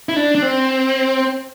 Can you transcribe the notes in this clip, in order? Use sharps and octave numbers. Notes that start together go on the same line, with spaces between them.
E4
D4
D4
C4